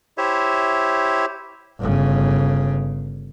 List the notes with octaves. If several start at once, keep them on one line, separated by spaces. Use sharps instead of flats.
E4 G4 C5 C#5 E5
G1 C#3